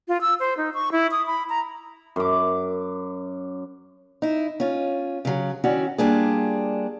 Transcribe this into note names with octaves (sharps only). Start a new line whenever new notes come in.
F4
E6
C5
D#4
C#6
E4
D#6
B5
A#5
F#2 D6
D#4 E4
C#4 F4
C#3 F#3
D#3 C#4 E4 F#4 D5
G3 A#3 D4 F4 G#4